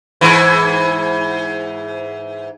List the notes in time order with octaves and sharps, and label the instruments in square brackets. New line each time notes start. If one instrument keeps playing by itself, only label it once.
[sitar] G#2 E3